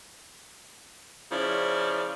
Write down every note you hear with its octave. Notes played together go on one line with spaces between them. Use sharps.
C#3 F3 E4 D5